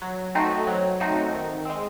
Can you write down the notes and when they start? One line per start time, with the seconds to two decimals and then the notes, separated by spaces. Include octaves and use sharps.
0.02 F#3
0.35 A3 C4 D#4 F#4
0.67 F#3
1.00 A3 C4 D#4 F#4
1.33 D#3
1.65 G#3 C4